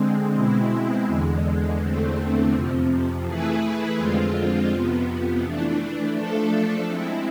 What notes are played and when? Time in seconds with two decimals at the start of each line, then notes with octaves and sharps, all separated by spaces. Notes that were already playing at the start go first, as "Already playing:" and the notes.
Already playing: D3 G#3 C4
0.34 B2 G#3 C4 E4
1.07 E2 D3 G#3
1.79 E2 D3 A3 C4
2.51 F2 C3 F3
3.24 E3 A3 E4 G#4 B4
3.97 F2 D3 G#3 C4 F4
4.69 F2 C3 F3 B3
5.41 E3 A3 D4
6.13 F3 A3 D4 A4
6.86 G#3 C4 E4